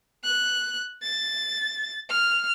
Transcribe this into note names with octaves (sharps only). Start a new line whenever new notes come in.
F#6
A6
F6